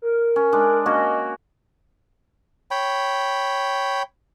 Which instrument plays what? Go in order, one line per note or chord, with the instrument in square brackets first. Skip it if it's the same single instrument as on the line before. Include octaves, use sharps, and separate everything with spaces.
[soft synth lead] A#4
[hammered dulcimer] C#4
G#3 D4
[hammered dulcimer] A#3 C#4 F#4 [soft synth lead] D#5
[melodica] C#5 G5 B5